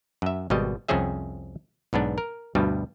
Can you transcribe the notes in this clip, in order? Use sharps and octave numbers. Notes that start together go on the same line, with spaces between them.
F#2 E5
G#1 B2 G3 D#5
C2 F2 C4 C#4 G#4 E5
B1 G#2 B3 D4
A#4
D2 G2 B2 G3